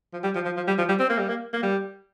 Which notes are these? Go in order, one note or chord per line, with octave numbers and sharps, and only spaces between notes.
F3
G3
F3
F3
F3
G3
F3
G3
C4
A#3
G3
A#3
A#3
G3